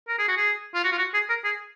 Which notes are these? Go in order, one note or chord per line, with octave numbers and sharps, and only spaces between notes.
A#4
G#4
F#4
G#4
F4
F#4
F4
F#4
G#4
A#4
G#4